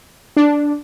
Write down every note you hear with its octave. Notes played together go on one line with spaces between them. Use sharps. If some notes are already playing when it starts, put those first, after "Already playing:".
D4